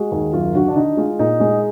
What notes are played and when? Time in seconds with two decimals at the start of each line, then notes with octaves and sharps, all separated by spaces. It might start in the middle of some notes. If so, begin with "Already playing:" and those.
Already playing: G#3 F#4
0.12 D#2
0.33 F#2 F4
0.54 D3 F#4
0.68 D4
0.76 D3 D#4
0.97 G#3 F4
1.19 A#2 D#4
1.40 G#3